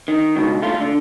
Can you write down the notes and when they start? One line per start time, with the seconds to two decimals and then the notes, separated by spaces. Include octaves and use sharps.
0.08 D#3
0.36 C#2 G2 B2 D#3
0.62 A3 F4
0.81 D3